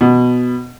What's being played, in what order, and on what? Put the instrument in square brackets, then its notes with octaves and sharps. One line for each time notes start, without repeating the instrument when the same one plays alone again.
[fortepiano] B2